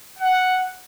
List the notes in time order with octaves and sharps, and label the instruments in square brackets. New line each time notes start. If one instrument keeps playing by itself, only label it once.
[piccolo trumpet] F#5